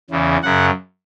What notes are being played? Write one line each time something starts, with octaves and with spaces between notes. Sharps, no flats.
E2 C#3 E3
F#2 C#3 F#5